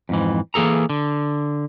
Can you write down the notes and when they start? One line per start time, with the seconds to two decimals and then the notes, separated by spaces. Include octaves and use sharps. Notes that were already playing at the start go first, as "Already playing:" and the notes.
0.09 F2 G#2 E3
0.54 E3 A#3 G#4 A4 A#5
0.89 D3